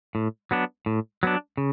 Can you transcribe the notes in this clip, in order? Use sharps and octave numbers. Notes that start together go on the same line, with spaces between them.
A2
F#3 B3 D4
A2
F#3 B3 D4
C#3